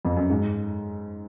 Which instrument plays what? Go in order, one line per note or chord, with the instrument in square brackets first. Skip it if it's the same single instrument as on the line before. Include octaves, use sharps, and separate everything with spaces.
[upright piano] F2
F#2
G#2